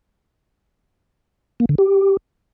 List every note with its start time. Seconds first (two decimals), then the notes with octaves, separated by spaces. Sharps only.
1.60 A#3
1.69 D3
1.78 G4